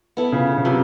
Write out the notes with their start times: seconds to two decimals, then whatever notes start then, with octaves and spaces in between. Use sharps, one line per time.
0.17 B3 E4 A4
0.32 C#3
0.57 C#3
0.65 C3 F#3